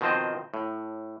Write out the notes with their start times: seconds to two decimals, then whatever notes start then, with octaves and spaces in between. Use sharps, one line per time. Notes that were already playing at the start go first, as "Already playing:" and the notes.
0.01 B2 D#3 F3 C4 C5 D#5
0.54 A2